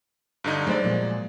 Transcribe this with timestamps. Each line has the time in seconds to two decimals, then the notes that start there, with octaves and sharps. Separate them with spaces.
0.44 G2 D3 D#4
0.67 F#3 G#3 A3 C5 D5
0.84 A#2 F3 F#3